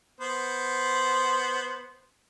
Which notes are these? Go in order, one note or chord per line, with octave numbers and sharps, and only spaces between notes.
B3 C5